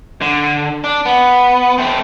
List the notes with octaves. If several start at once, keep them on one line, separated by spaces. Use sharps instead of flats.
D3
D4
B3
A3 C4